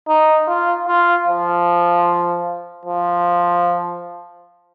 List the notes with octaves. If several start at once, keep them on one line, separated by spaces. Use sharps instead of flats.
D#4
F4
F4
F3
F3